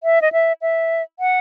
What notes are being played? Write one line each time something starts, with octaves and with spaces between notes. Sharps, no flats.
E5
D#5
E5
E5
F#5